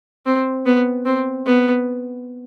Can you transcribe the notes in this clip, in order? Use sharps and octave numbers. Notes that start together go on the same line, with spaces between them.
C4
B3
C4
B3